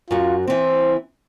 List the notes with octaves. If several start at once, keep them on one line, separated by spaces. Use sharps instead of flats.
F#2 F4 F#4
E3 C4 C5